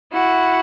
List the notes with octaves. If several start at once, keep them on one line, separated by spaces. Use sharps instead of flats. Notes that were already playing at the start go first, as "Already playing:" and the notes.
E4 F#4 F#5